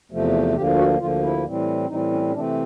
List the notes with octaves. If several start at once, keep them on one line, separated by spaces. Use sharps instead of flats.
E2 C3 F3 A3
D2 D3 F3 A#3 G4
F#4
D2 D3 F3 A#3 F4
E4
A2 E3 G3 C4
A2 E3 G3 C4 D#4
C#4
C#4
C3 E3 A3 C4 D4